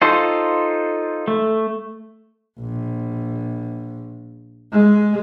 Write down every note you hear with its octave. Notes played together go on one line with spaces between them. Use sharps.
D#4 F4 A4 C5
A3
A#1
G#3